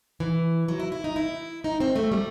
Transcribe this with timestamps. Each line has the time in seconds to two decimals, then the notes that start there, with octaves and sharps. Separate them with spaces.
0.20 E3
0.68 F#3
0.80 E4
0.92 E4
1.04 D#4
1.16 E4
1.64 D#4
1.80 C4
1.96 A3
2.12 G3